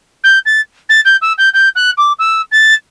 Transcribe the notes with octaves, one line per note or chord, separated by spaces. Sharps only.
G6
A6
A6
G6
E6
G6
G6
F#6
D6
E6
A6